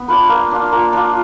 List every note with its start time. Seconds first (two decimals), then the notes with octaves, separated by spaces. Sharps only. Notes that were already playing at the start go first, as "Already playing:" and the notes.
Already playing: B3
0.08 D4 F4 B4
0.29 A#3
0.51 D4 F4
0.72 A#3
0.93 D4 F4